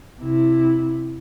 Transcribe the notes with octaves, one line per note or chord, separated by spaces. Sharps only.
C3 E4